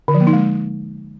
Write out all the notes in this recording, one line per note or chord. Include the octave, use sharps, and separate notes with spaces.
D3
F3
A#3
D#4
G#3